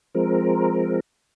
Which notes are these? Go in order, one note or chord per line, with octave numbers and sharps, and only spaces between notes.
F3 G#3 C4 A#4